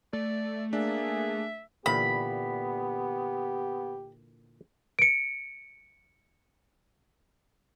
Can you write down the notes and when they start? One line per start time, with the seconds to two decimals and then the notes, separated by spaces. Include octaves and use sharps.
0.13 A3 D5
0.73 A#3 D4 G#4 E5
1.86 A#2 D3 E3 B3 G4 B5
4.99 C#7 D7